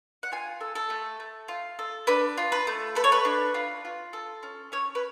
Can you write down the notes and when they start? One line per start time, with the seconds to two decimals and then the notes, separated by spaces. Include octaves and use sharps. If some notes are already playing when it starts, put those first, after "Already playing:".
0.23 F#5
0.32 F4 G#5
0.61 A4
0.75 A4
0.90 A3
1.20 A3
1.48 F4
1.79 A4
2.07 D4 B4
2.38 F4
2.52 B4
2.67 A3
2.95 A4 B4
3.04 C#5
3.12 B4
3.25 D4
3.54 F4
3.85 F4
4.13 A4
4.43 C#4
4.72 C#4 C#5
4.95 B4